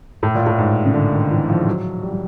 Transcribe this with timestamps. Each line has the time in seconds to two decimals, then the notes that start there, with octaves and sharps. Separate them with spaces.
0.23 A2
0.35 A#2
0.46 A2
0.58 G#2
0.85 C#3
0.94 D3
1.12 D#3
1.31 E3
1.49 F3
1.67 F#3
2.03 G3
2.11 F#3